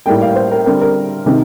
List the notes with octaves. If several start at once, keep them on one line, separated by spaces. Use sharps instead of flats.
A2 G3 A#3 G5
F5
C5
A#4
D3 G3 C4 A#4
A#4
C3 D#3